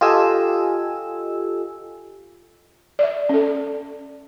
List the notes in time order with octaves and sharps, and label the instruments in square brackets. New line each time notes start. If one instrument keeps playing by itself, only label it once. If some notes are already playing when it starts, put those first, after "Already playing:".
[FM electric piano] F4 G4 A4 D#5 G#5 E6
[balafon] D5 E5
C#4 A4